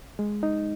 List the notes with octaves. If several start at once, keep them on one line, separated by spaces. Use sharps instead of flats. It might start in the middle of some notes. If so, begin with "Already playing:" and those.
G#3
D#4